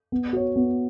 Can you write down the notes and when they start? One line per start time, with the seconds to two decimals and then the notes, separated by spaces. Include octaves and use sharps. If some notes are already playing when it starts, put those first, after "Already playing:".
0.12 B3
0.33 F#4 C#5
0.56 B3